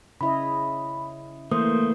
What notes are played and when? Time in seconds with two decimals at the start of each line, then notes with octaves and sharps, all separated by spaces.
0.21 C#3 E4 D#5 B5
1.51 E3 A3 A#3 C5 D#6